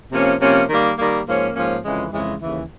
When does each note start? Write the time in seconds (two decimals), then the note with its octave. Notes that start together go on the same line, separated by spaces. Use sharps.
0.12 C3 F3 A#3 C#4
0.40 C3 F3 A#3 C#4
0.69 D#3 G3 A#3
0.98 D#3 G3 A#3
1.26 G#2 F3 A#3 C#4
1.55 G#2 F3 A#3 C#4
1.83 F2 C#3 E3 G#3
2.12 F2 C#3 E3 G#3
2.40 D#2 C#3 E3